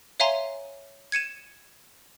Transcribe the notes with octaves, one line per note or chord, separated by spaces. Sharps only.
C#5 E5 F5 G#5 A#5 C6
G#6 C#7 D#7 E7